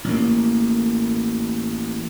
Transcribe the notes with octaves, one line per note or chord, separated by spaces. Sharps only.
A1 A#3